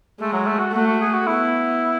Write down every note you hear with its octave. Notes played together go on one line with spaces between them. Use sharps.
G#3 A3
F#3
A3
F#4
A3 F#4
F#4
G#4
F#4
B3 E4